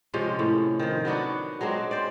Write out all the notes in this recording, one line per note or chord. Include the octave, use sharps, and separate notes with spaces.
C3 F3 G#3 C#4
A2
D#3 F3
F#3 B3 D4 F#4
F#3 G#3 C4 D4
C5 D5